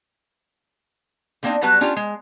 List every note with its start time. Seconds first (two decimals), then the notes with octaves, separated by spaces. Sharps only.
1.43 D3 A#3 C4 D4 D#4
1.62 F#3 G3 B3 F#4 B4 A5
1.81 C#4 D4 F4 G4
1.96 G#3